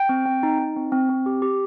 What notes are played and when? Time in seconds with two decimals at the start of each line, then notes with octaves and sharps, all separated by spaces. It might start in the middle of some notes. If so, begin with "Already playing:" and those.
Already playing: G5
0.09 C4
0.26 C4
0.43 D#4
0.59 D#4
0.76 C4
0.92 C4
1.09 C4
1.26 G4
1.42 G4